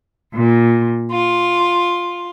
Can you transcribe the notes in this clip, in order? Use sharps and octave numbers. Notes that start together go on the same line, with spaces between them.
A#2
F4